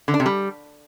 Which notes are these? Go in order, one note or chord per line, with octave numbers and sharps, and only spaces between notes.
D3
D4
C3
G3